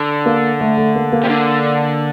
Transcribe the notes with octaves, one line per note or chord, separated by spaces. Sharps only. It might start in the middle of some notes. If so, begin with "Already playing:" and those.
Already playing: D3
A#3
A3
A3
A#3
A#3
C3
D3